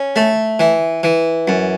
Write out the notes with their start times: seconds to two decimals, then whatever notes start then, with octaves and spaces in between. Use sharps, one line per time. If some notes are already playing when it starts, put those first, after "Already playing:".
Already playing: C#4
0.16 A3
0.60 E3
1.03 E3
1.48 F#2